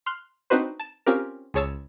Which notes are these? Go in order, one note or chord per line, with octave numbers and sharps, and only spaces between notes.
C6 F6 F#6
C4 D4 D#4 F#4 B4 C5
A5 E7
C4 C#4 F4 G4 A#4
C#2 G#4 C#5 A5 E6